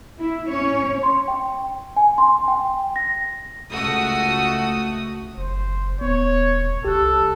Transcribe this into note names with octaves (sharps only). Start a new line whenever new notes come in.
E4
C#4 C#5
C6
G5
G#5
C6
G5
A#6
C#2 A3 F#4 D#6
F#1 C5
D#1 B3 C#5
C2 G4 A4 F#6